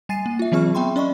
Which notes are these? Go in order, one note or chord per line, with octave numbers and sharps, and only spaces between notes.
G3 G#5 A6 C7 D#7
A#3
F4 E5
E3 F#3 C4 G#4 C#6 F6
B3 E5 G5 B5 C6
C#4 D5 D#5 B5 C#6